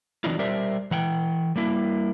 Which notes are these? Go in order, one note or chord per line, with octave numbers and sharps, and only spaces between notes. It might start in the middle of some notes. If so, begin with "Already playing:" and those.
E3 F#3 C4 D4 D#4 F4
G3 G4 A#4 C5 D5 E5
E3 F#5 G5
G3 A#3 E4